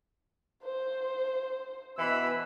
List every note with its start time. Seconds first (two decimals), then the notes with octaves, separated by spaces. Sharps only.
0.63 C5
1.98 B2 E3 B5 E6